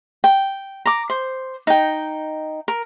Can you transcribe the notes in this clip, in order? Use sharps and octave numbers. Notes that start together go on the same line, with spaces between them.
G5
A#5 D6
C5
D#4 G5
A#4